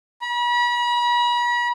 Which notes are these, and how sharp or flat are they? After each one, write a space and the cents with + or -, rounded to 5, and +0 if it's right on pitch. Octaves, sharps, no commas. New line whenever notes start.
B5 -40